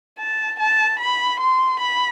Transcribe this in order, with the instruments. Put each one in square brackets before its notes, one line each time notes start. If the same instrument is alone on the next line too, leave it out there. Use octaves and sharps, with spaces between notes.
[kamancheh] A5
A5
B5
C6
B5